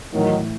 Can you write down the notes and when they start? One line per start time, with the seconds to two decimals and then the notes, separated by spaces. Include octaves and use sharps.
0.13 A2 D#3 E3 F#3 A3 E4